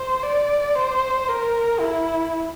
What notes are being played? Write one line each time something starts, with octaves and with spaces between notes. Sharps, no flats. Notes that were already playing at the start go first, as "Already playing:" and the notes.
Already playing: C5
D5
C5
A#4
E4